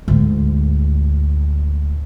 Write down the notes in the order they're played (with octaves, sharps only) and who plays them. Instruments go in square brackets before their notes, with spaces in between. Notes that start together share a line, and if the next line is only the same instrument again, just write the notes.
[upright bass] D2 G#2